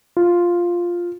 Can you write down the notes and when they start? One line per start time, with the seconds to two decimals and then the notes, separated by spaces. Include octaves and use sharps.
0.17 F4